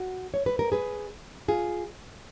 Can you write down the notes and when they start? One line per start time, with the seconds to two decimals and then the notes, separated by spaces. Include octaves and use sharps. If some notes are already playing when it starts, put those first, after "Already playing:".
Already playing: F#4
0.34 C#5
0.46 B4
0.59 A#4
0.72 G#4 B4
1.48 F4 G#4